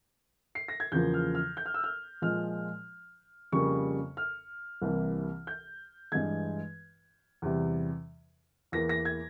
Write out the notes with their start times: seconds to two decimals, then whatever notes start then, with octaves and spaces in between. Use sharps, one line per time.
0.55 C7
0.68 A#6
0.80 G#6
0.92 E2 C#3 F3 A#3 G6
1.14 F6
1.35 F6
1.57 G6
1.66 F6
1.74 E6
1.84 F6
2.22 A#2 F3 G#3 F6
3.52 F2 C#3 G3 A#3 C#6
4.17 F6
4.82 C2 C3 E3 A#3
5.47 G6
6.12 G2 E3 G#3 G#6
7.42 E2 C3 G3
8.72 E2 E3 A#3 A#6
8.89 A#6
9.05 G#6